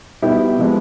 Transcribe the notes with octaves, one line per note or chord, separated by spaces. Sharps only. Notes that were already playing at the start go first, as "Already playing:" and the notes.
B2 G3 B3 E4 G4
C3 F3 G#3 B3